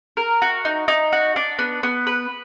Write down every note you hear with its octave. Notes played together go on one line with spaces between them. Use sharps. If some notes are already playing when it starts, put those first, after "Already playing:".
A#4
F#4
D#4
D#4
F#4
D4
B3
B3
B4